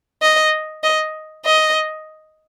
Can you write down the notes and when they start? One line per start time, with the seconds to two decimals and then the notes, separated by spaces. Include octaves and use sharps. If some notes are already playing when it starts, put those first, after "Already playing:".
0.22 D#5
0.83 D#5
1.45 D#5